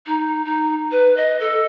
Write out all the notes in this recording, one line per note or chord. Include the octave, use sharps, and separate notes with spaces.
D#4
D#4
B4
D#5
A4